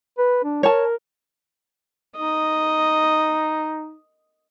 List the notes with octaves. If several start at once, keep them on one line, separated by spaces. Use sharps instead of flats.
B4
D4
A#4 C#5 A5
D#4 D#5